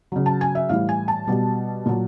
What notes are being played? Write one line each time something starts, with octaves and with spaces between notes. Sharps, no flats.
C#3 F#3
A5
G#5
E5
A2 E3 G3 F5
G#5
A5
B2 G3
A#2 F#3